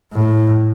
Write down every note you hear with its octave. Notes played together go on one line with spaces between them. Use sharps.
A2